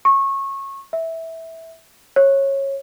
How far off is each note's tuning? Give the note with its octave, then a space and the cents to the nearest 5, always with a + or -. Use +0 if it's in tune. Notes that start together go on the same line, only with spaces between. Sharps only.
C#6 -20
E5 -15
C#5 -20